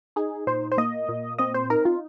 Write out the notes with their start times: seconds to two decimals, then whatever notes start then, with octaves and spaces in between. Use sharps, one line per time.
0.16 D#4 G#4
0.47 A#2 C5
0.72 C5
0.78 A#3 D#5
1.09 A#2
1.38 C4 D#5
1.54 C5
1.70 D#4 A#4
1.85 F4